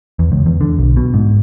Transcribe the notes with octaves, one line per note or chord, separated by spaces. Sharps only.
E2
C#2
E2
D3
B1
B2
G#2